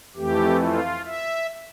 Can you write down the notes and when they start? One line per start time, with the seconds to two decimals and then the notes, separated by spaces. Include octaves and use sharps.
0.16 F2 E3 A3 G4
0.61 F4
1.06 E5